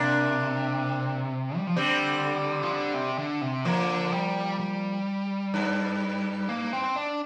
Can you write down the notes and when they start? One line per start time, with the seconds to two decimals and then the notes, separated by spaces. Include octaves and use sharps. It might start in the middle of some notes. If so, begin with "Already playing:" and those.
Already playing: C3 A#3 D4
1.57 G3
1.67 F3
1.76 D3 G3 C4
2.63 F3
2.71 D3
2.94 C3
3.18 D3
3.41 C3
3.65 D3 F3 A#3
4.12 G3
4.59 G3
5.54 G2
6.49 A#3
6.73 C4
6.96 D4